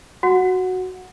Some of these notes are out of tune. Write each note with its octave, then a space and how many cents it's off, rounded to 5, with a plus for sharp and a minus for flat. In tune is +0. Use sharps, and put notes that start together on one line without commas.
F#4 +0 F#5 -10